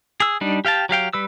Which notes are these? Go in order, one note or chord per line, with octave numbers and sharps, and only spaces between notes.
G#4 E6
G3 D4 D#4
G4 F5 G5 A5
F#3 G4 F5 G5
G3 B4 E6